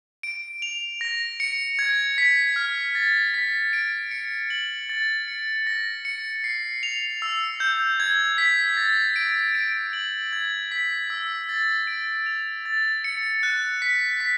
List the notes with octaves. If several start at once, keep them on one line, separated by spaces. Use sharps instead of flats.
D7
F7
A#6
C#7
G#6
B6
F6
A6
B6
D7
C#7
F#7
A6
C#7
A#6
C#7
C7
F7
E6
G6
G#6
B6
A6
D7
D7
F#7
G#6
B6
E6
A6
D7
F7
A6
C#7
F#6
B6
B6